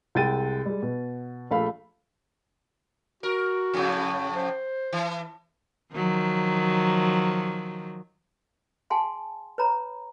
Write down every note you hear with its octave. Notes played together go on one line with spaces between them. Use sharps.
C2 G#3 G5 A6 D#7
G3 G#3
B2
A#1 A3 F5 B5
F#4 A#4
F2 A2 C#3
C5
E3
D#3 F3 F#3
G#4 F#5 G#5 A5 C6
B4 C#5 A#5 B5